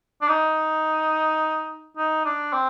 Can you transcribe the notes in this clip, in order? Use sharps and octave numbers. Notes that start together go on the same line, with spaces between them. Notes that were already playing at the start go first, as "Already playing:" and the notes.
D4
D#4
D#4
D4
C4